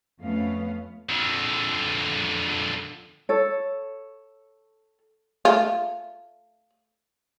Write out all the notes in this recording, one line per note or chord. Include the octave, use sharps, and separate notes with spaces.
F2 A3 B3 C#4 F5
F2 D3
A4 C#5
A3 F4